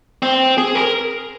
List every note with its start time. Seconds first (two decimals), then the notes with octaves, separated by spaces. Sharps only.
0.23 C4
0.58 G#4
0.75 A#4